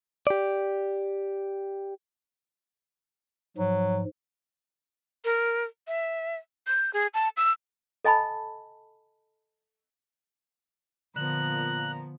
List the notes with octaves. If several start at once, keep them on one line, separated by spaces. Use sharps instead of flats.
G4 D5
G#2 F3 F#3
A#4
E5
G6
G#4
A5
E6
A4 D#5 G#5 A5 B5
A#2 D3 F3 B3 A#5 F#6